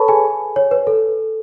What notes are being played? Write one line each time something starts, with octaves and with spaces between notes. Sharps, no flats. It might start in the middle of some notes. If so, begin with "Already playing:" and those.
Already playing: A4 B4 C#5 A5 B5 C#6
G#4 G#5
C#5
B4
A4